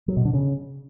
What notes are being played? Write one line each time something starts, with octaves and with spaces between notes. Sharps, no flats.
F#3
B2
D3
C#3